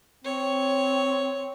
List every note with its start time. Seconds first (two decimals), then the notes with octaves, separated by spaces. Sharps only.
0.24 C4 C#5